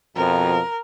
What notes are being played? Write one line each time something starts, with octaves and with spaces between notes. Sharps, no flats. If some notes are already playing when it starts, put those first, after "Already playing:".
F2 B2 F3 A#4